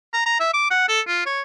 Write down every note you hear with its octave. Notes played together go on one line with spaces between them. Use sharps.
A#5
A#5
E5
D6
F#5
A4
F4
C#5